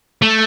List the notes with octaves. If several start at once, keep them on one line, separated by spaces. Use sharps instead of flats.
A3